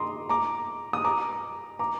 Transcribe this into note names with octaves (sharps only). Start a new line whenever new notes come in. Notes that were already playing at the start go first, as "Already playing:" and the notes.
Already playing: A#5 C6 D6 D#6
A#5 D6
D#6
A#5 D6
A#5 D6